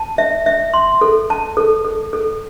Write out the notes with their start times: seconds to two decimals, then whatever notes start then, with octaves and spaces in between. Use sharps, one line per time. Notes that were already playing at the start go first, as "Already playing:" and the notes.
Already playing: A5
0.18 E5
0.46 E5
0.74 C6
1.01 A4
1.30 A5
1.57 A4
1.85 A4
2.13 A4